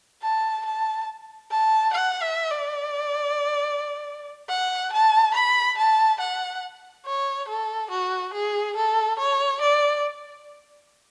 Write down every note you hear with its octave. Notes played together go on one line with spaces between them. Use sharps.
A5
A5
A5
F#5
E5
D5
F#5
A5
B5
A5
F#5
C#5
A4
F#4
G#4
A4
C#5
D5